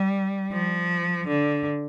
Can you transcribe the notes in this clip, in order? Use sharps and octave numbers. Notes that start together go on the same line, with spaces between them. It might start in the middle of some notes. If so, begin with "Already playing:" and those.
Already playing: G3
F3
D3